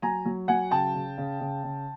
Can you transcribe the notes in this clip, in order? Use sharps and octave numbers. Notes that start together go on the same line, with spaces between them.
F#3 G#5 A#5
F#3
F#3 F#5 G#5
C#3 G5 A5
C#3
C#3
C#3
C#3